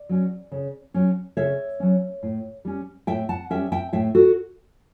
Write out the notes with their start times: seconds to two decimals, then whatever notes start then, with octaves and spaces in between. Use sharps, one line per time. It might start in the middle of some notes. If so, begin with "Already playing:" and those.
Already playing: D5
0.09 F#3 C#4
0.52 C#3
0.94 F#3 C#4
1.37 C#3 C#5 E5
1.80 F#3 C#4
2.23 A2
2.65 G3 C#4
3.07 A2 E5 G5
3.29 F#5 A5
3.50 G3 C#4 E5 G5
3.72 E5 G5
3.93 A2 E5 G5
4.15 F#4 A4